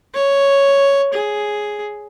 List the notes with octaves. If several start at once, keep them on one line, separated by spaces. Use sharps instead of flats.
C#5
G#4